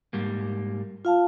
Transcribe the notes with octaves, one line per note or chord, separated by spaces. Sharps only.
G#2 G3 A#3
F4 F5 A5